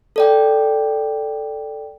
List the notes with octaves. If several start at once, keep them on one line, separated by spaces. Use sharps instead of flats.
A4 D5 G5